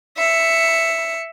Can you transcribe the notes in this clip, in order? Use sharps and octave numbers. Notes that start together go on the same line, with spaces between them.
E5 C#7